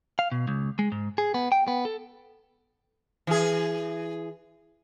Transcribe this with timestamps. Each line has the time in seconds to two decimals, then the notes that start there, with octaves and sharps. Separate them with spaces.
0.19 F5
0.32 B2
0.48 C#2
0.79 G#3
0.92 G#2
1.18 G#4
1.34 B3
1.52 G5
1.68 B3
1.85 A4
3.27 E3 G#4